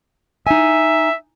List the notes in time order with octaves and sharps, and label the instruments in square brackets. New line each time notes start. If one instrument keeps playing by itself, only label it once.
[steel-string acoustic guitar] D#4 G#5 [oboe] E5